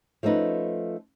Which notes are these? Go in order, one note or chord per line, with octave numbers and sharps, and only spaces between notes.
F3 A3 C#4 D#4 B4